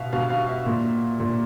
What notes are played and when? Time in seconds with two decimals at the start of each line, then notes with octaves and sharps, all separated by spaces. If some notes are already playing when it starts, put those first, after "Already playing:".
Already playing: B2 E5 F5
0.13 B2 F5
0.30 F5
0.49 E5
0.66 A#2
1.20 A#2